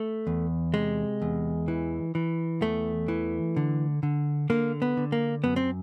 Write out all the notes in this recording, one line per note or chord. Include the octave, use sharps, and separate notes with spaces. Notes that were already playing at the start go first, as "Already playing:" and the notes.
Already playing: A3
E2
C3 G#3
E2
E3
E3
E2 A3
E3
D3
D3
D3 A#3
B3
D3
A#3
F#2 B3
C4